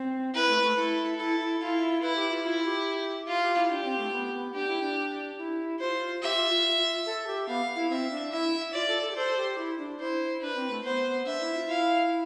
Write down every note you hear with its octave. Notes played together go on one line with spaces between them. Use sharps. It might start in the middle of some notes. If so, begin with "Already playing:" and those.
Already playing: C4
E4 B4
A3
A3
E4 A4
E4 A4
E4
E4 F4
E4 B4
G4
F4
E4 F4
G4
F4
G4
E4
D4 G4
C4
A3
B3
B3
D4 G4
E4
D4
E4
F4 C5
G4 E5
F4
F4
F4
A4
G4
B3 F5
E4
C4 E5
D4
E4 E5
F4 D5
A4
A4
G4
A4 C5
G4
E4
D4
E4 C5
D4 B4
C4
A3
B3 C5
D4 E5
E4
F4
E4 F5